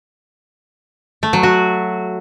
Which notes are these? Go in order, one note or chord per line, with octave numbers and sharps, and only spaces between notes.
A3
F#3
F#4